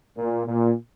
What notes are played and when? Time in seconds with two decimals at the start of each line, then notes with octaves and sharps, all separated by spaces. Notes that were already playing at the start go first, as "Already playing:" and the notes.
0.18 A#2
0.47 A#2